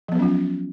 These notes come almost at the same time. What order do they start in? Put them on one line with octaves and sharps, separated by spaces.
F3 B3 F#3 C#4 F4